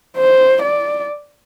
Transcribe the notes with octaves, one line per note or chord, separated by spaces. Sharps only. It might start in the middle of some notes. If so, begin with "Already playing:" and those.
C5
D5